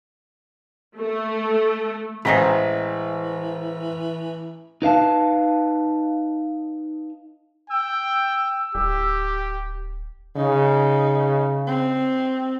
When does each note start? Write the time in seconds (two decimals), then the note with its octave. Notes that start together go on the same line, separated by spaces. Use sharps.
0.98 A3
2.25 A1 E3 G#3 C5 D#5 G5 A#5 B6
4.82 D#4 B4 F5 A5
7.70 G5 E6
8.75 D1 G4
10.36 C#3 D#4
11.67 C4